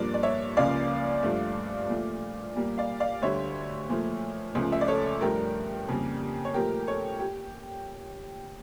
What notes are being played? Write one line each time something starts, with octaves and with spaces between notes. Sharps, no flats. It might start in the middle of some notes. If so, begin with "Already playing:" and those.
Already playing: G2 F3 A#3 A#4 D5
D5
C#5 E5
C#2 C#3 F3 A#3 D5 F5
G2 F3 A3
A#2 F3 A3
A#2 G3 A#3
D5 F5
D5 F5
D2 D3 G3 C#5 E5
A#2 F3 A3
C#2 C#3 F3 A3
E5
D5
A4 C#5
G2 F3 A3 G4 A#4
F2 C#3 G3 A#3
C#5
A#2 F3 A3 G4 A#4
A4 C#5
G4